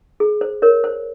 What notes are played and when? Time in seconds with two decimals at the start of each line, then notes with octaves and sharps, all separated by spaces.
0.20 G#4
0.41 C5
0.62 A#4 C#5
0.84 C5